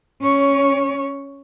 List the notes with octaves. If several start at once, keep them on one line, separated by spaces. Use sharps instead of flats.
C#4 C#5